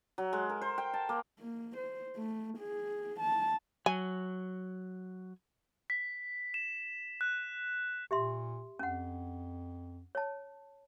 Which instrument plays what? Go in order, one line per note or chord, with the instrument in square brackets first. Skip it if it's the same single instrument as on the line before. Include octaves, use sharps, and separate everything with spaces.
[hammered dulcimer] F#3
G#3
A#4
C5
G5
A5
A#3
[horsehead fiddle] A#3
C5
A3
G#4
A5
[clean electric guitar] F#3 [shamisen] G#5
[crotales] B6
E7
F#6
[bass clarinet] A#2 [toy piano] G4 E5 C6
[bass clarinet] F2 [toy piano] C#4 F#5
[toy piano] C#5 A5